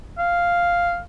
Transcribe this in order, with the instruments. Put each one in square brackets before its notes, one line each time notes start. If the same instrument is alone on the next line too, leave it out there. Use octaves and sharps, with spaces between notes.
[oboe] F5